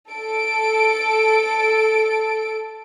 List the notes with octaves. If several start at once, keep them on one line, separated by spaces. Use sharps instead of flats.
A4 D7